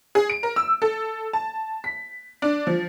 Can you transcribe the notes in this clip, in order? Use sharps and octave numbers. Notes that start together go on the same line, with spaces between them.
G#4
D7
A#4
E6
A4
A5
B6
D4
F3